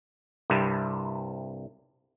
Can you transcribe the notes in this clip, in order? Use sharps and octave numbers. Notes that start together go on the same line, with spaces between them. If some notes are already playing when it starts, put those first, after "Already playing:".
C2 G2 C3